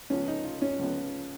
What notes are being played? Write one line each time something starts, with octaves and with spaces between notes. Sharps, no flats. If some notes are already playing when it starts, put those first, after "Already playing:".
C#2 C#3 F3 B3 C#4
D#4
F4
C#4
C#2 C#3 F3 B3